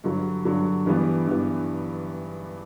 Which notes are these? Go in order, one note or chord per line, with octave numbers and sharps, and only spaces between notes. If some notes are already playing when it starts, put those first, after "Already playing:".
G2 D3 F#3
G2 D3 F#3
G2 E3 G3 B3
G2 E3 G3 B3